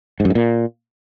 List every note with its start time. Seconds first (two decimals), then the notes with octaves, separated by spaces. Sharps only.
0.20 G#2
0.25 F#2
0.30 G#2
0.35 A#2